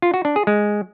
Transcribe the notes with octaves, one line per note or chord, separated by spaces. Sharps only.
F4
F#4
D4
G#4
G#3